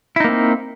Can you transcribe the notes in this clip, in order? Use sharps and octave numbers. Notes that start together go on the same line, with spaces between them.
A#3 C4 D#4 E4